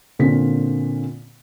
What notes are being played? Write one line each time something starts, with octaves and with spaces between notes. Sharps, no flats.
A#2 D3 A#3 C4 C#4 B6